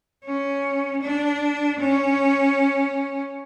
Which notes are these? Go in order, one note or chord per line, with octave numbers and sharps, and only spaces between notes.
C#4
D4
C#4